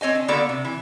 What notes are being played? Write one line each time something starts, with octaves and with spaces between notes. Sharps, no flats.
C4 C#5 D#5 G#5
D4
D3 A#3 B3 F#4 A4 D5
C3
E3